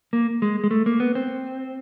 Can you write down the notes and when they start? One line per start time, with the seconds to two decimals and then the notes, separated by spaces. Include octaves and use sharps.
0.13 A#3
0.42 G#3
0.64 G#3
0.71 A3
0.86 A#3
1.00 B3
1.15 C4